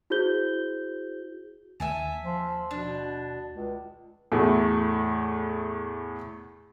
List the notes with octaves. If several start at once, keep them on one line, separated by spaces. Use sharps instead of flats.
E4 F#4 G#4 C5 G6 G7
D#2 E5 G#5 A5
F3
B2 D4
C#2
E2 A2 A3